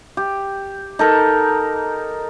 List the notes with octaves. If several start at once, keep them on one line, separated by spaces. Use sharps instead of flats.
G4
D#4 A4 A#4